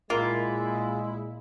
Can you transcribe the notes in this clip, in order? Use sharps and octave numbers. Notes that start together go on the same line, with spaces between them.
A#2 G#3 A#3 E4 F4